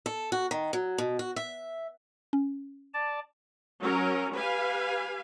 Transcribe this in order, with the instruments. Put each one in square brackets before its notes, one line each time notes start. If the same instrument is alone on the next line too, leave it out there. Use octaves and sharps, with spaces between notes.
[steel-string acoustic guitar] A4
F#4
D#3
F#3
B2
F#4
E5
[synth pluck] C#4
[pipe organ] D5 A5
[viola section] F#3 C#4 A#4
G4 B4 F5 G#5